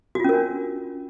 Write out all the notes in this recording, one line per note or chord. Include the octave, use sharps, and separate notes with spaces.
C#4 D4 F4 F#4 A#4